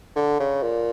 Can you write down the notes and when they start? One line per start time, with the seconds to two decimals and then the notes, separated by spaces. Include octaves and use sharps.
0.16 D3
0.39 C#3
0.63 A#2